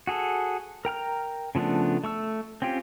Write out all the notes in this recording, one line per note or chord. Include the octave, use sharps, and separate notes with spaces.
F#4 G#4 A4
A#4 G5 A#5 F6
C#3 F3 A3 B3 D4
A3 C#6 E6
C4 C#4 F4 G4